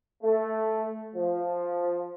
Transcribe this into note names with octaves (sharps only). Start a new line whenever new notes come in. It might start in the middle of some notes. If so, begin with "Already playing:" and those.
A3
F3